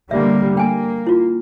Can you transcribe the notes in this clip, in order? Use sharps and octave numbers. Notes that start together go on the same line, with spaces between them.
D3 G3 A#3 E5
A#3 G5 G#5
E4 F4